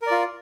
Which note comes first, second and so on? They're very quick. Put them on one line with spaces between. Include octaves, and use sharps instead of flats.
A#4 D5 F4